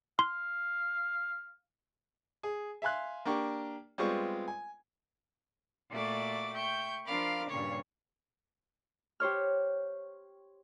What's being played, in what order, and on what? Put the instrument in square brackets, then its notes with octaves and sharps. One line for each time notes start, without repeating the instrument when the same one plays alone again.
[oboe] F5 [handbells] C6
[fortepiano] G#4
E5 F5 G#5 C6 F#6
A#3 D4 G4 C#6
G3 G#3 B3 C4 F4 C#6
G#5
[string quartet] A#2 A3 F#4 D5 E5 D6
E5 G5 C#6 G6
F3 D4 A#4 F5 B5 D6
G2 A#2 C#3 G3 C#5
[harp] G4 C5 C#5 F6